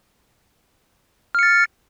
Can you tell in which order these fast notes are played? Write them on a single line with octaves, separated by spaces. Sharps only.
F6 C#7 A6